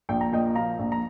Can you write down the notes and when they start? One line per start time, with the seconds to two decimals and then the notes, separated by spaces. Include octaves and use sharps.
0.09 A#1 G5
0.21 A#5
0.32 A#2 D#5 G5
0.55 F3 F5 A#5
0.79 A#1
0.92 A#5